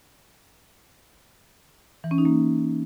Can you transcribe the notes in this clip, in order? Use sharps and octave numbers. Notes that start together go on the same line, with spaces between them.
E3
C#4
D#4
A#3